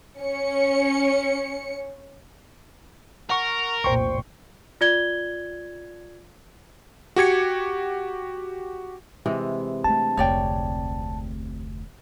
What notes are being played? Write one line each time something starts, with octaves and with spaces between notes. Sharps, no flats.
C#4 C#7
A#4 F#5 C#6
F1 C2 A#2 C5 G5 C6 C#6
F4 D5 G#6 G7
F#4 G4 G#6 C#7
C3 E3 G#3
A3 D4 A5
F1 D2 C#5 D5 G5